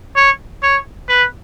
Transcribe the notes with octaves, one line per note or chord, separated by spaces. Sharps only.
C#5
C#5
B4